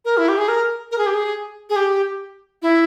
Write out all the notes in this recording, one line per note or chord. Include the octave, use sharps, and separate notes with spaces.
A#4
E4
G4
G#4
A#4
A#4
G#4
G4
G#4
G#4
G4
E4